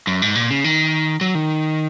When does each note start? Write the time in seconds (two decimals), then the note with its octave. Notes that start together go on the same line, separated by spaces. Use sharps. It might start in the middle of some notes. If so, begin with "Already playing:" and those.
0.07 F#2
0.22 G#2
0.35 A#2
0.50 C#3
0.64 D#3
1.21 F#3
1.35 D#3